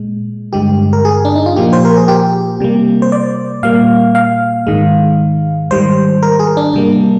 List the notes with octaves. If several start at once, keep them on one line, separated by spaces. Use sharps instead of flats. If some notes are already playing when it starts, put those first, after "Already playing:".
Already playing: A#2 G#3
G2 D3 G#3 G4
A#4
G#4
D4
D#4
F4
A#2 F3 A#3 G4
C5
A#4
G#4
G4
C3 G3 A#3
C5
D5
A#2 G3 A#3 F5
F5
G#2 D#3 G#3
G#2 D#3 G3 C5
A#4
G#4
D4
C3 G3 A#3